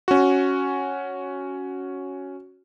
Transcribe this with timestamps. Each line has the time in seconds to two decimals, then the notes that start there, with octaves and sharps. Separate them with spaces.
0.08 C#4 F#4